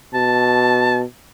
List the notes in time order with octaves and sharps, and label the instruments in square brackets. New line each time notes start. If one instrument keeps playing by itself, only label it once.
[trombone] B2 [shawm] A5